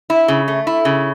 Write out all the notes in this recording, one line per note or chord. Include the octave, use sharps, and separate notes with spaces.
E4
C#3
A3
E4
C#3